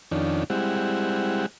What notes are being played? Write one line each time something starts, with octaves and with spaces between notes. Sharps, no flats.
F2 D#3 C#4 D4
G3 G#3 C4 E4 F#5